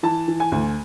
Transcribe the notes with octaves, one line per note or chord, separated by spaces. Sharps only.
E3 A5
E3
G#5
D2